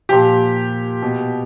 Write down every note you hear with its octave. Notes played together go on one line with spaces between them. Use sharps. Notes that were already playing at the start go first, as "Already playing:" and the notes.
A#2 F3 G4
B2